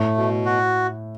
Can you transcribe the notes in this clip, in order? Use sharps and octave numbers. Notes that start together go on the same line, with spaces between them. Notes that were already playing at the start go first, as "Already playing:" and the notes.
Already playing: A2 A3
B2
F#4